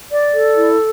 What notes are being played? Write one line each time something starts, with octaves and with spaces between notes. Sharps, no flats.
D5
A4
E4